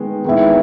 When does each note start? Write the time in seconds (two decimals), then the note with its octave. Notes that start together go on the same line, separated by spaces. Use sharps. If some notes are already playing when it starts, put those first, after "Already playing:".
Already playing: D#3 G#3 B3
0.25 D#3 G#3 B3 E4